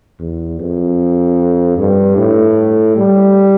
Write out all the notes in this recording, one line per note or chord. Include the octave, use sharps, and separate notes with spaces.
E2
F2
G2
A2
G3